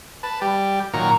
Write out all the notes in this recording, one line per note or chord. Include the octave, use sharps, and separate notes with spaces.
B4 A5
G3 G4
A#2 D#3 F#3 A#4 A#5 C#6